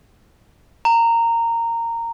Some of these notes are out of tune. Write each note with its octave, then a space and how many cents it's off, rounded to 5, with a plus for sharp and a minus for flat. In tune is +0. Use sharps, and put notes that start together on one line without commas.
A#5 -15